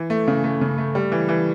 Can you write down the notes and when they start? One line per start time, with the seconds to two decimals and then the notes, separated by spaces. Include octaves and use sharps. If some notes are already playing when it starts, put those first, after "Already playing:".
Already playing: E3
0.10 A3
0.28 C#3
0.44 A3
0.61 C#3
0.78 A3
0.95 G3
1.12 E3
1.29 E3